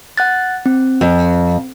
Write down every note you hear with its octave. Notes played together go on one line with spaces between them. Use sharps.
F#5 F#6 A6
C4
F2